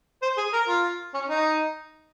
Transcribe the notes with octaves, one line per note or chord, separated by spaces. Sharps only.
C5
G#4
A#4
F4
C#4
D#4